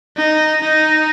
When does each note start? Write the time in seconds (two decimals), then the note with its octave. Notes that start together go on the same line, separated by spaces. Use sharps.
0.17 D#4
0.62 D#4